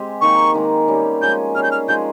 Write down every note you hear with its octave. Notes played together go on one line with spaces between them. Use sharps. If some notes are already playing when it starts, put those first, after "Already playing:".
Already playing: G#3 C4 G4
D#3 A#3 D#4 C#6
D#3 G#3 D#4
G3 C#4 G4
F3 G#3 C#4 G#4 G6
G3 C#4 G#4 F6
G6
F6
F3 G#3 D#4 G#4 G6